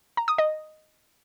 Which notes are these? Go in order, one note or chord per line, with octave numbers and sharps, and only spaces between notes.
A#5
D#6
D#5